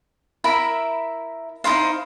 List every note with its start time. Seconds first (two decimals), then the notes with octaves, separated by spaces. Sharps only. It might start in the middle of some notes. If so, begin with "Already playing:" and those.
0.44 E4 A#4 E5 B5
1.64 D#4 E4 C5 F5